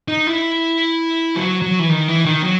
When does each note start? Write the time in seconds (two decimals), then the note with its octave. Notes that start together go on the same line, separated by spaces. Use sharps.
0.08 D#4
0.27 E4
1.36 F#3
1.62 F#3
1.79 E3
1.90 D#3
2.08 E3
2.26 D#3
2.44 F#3